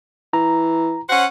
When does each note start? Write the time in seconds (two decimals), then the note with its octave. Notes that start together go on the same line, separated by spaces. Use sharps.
0.33 E3 A#5
1.09 C#4 C5 F#5